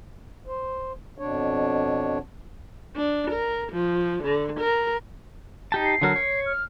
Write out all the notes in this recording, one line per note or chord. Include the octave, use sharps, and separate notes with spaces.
C5
F2 B2 D4 C#5
D4
A#4
F3
D3
A#4
D#4 G4 A5
C7
D3 F#3 A#4
C#5
F6